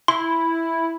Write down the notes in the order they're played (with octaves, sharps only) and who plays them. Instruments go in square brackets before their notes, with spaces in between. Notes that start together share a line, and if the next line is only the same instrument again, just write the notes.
[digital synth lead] E4 [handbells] C6